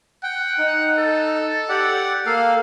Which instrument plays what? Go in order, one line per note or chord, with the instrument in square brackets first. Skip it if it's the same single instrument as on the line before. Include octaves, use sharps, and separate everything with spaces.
[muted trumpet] F#5 [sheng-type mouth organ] G5
[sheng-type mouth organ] D#4
[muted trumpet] A4
[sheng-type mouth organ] G4 D5 F#5
[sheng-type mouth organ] A#3 A4 [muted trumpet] F5